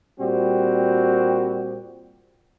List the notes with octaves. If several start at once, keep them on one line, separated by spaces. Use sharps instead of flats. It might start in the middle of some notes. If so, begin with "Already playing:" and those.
A#2 G3 C4 F#4 G4